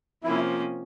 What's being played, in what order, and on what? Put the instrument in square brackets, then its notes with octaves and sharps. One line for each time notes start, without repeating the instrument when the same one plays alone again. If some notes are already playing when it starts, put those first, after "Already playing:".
[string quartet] C3 F3 A#3 C#4 [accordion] E4